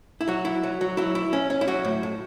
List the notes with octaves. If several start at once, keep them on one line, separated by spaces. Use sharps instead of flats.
E4
F#3 F#4
E4
F#3
F#3
F#3 E4
E4
C#4
C#4
E4
F#3 F#4
A2
A2